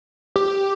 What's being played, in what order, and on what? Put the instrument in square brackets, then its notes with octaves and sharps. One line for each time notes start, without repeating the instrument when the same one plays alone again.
[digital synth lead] G4